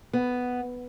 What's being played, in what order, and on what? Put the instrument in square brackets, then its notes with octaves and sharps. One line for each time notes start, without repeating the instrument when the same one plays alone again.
[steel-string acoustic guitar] B3